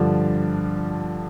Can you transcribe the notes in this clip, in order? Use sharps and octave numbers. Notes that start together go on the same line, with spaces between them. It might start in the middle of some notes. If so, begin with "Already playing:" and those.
Already playing: G2 D3 F3 D5